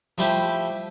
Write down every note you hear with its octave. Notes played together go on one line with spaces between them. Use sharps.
F3 G3 A3 E4 G4 C5